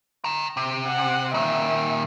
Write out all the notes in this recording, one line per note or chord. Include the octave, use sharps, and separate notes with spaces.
G5 A#5
C3
F#5
A#2 D#3 E5